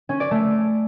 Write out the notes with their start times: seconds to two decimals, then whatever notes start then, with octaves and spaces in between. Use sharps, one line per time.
0.09 C#4
0.20 D5
0.31 A3